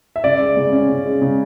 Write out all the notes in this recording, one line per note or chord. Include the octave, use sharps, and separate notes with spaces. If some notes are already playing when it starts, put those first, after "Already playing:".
E5
C#3 D5
G#3
C#3
C#4
C#3
G#3
C#3